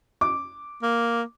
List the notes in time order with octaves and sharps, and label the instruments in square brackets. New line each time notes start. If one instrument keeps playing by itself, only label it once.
[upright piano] D6
[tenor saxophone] A#3